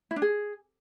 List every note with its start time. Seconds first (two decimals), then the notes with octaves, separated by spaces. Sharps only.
0.11 E4
0.16 D4
0.22 G#4